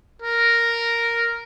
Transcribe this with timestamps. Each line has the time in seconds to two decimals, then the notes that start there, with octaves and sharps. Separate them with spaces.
0.22 A#4